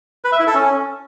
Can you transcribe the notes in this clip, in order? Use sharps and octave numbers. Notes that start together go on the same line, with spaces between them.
B4
E5
E4
A4
C#4